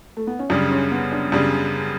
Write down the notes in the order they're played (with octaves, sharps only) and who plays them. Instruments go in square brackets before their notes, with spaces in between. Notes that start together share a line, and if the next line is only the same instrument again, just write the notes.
[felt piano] A3
B3
C#4
[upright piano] F#2 C#3 G3 [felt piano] D4
[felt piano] C#4
B3
D4
[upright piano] F#2 C#3 G3 [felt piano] D4